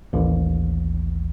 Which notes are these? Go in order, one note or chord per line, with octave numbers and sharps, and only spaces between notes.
A1 D#2